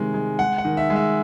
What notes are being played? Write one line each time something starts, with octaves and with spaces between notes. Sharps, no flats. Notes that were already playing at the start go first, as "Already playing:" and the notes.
Already playing: C3 D#3 G#3
G#3
G#3 F#5
F#5
D#3
E5
G#3
E5